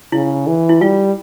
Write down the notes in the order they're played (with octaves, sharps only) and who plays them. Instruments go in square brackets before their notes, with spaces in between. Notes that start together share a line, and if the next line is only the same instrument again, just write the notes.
[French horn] C#3 [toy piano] E4
[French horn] E3
[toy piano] E4
[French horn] G3 [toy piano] F4